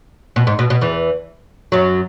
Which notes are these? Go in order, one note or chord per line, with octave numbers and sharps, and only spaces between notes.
B2
G#2
B2
B2
E2 E3
F#2 F#3